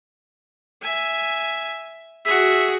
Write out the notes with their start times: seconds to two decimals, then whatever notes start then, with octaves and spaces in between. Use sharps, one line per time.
0.82 E5 G#5
2.25 F#4 G#4 E5